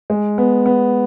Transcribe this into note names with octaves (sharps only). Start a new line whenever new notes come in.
G#3
B3
B3